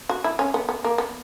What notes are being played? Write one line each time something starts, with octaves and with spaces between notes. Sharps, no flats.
F#4
E4
C#4
B3
B3
A#3
B3